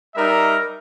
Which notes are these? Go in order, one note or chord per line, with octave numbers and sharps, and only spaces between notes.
G3 D#4 A#4 E5